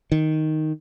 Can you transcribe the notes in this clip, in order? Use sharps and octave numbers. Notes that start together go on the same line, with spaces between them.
D#3